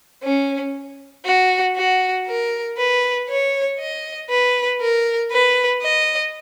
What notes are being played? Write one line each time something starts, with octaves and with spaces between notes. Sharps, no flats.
C#4
F#4
F#4
A#4
B4
C#5
D#5
B4
A#4
B4
D#5